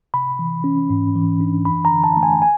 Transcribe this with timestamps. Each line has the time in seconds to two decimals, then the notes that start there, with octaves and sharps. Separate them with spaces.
0.14 C3 B5
0.39 E3
0.64 C#4
0.90 G#2
1.16 E3
1.41 D4
1.65 F#2 B5
1.85 A#5
1.91 D3
2.04 A5
2.17 A3
2.23 G#5
2.42 G#5